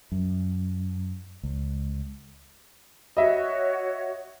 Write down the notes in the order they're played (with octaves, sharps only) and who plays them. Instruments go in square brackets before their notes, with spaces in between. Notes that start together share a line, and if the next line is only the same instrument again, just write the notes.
[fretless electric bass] F#2
C#2
[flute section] F#4 C#5 [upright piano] D#5 E5